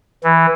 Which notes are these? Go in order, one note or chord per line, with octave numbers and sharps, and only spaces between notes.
E3